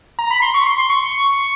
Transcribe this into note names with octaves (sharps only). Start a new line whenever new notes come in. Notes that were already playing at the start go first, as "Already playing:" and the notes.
A#5
B5
C6
C#6
C6
C6
C#6